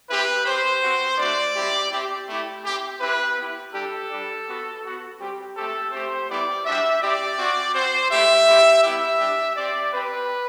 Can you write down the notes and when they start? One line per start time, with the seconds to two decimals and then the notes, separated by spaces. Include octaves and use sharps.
0.09 C4 E4 G4 B4
0.46 C4 G4 C5
0.83 C4 F#4
1.18 A3 D4 F#4 D5
1.55 G3 C4 E4 G4
1.91 C4 E4 G4
2.28 A3 E4 G4
2.64 C4 E4 G4
3.00 C4 E4 G4 B4
3.37 B3 E4 G4
3.73 G3 D4 G4 A4
4.11 G3 D4 G4
4.47 B3 F#4
4.83 B3 F#4
5.20 G3 C4 G4
5.56 A3 C4 G4 A4
5.91 A3 C4 G4 C5
6.28 G3 B3 E4 G4 D5
6.64 G3 D4 F#4 E5
7.01 C4 E4 G4 D5
7.37 C4 F#4
7.75 C4 F#4 C5
8.10 A3 E4 G4 E5
8.47 G3 C4 E4 G4
8.83 G3 B3 E4 G4 E5
9.19 G3 D4 G4
9.56 C4 G4 D5
9.93 C4 G4 B4